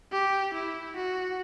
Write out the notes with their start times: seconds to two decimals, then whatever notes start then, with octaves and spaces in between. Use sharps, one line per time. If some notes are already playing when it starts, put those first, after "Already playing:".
0.13 G4
0.54 E4
0.97 F#4